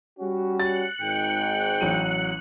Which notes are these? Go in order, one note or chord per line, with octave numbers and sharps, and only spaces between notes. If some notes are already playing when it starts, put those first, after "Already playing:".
G3 C#4 F#4
F#6 A6 C#7
G#1 G#2 G5
A1 F#3 D#7